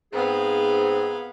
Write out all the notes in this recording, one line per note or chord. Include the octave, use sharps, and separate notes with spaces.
G#2 B3 C4 G#4 F5